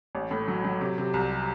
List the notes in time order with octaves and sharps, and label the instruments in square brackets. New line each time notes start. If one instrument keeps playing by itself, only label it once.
[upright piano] A1
A2
F#3
F#3
C3
C3
C2